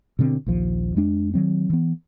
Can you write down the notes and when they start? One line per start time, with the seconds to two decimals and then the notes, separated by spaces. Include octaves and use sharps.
0.19 B2 D3 B3 C4
0.46 A#1 D#2 F3
0.96 F2 G#3 D4
1.34 D#3 F#3 C4
1.70 E3 B3